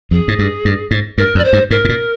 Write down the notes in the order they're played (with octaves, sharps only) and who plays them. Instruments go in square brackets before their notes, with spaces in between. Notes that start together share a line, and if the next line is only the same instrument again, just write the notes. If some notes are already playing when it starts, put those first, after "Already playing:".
[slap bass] F2 [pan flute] G#4
[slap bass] G#2
G2
G2
G#2
[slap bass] G2 [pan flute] A#4
[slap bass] F2
[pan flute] D5
C5
[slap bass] G2
[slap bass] G#2 [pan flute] A#4
[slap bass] G#2
A#2